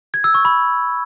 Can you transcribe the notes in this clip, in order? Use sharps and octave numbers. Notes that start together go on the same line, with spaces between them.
G#6
E6
C#6
B5